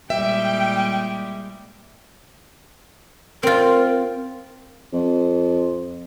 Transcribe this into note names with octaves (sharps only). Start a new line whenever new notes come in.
A#2 G3 G#3 E5 G5
C4 F4 A#4
F2